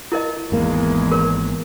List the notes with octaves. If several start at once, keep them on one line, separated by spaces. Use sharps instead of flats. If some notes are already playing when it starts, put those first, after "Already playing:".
E4 A#4 D#5
G#1 E2 G#3 A#3
A#4 C#5